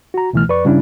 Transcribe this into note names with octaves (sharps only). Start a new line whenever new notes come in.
F#4 A#5
C#2 B2 E3 A3 F6
F2 B4 D5 C#6
G2 C#3 G3 C#4 D4 E4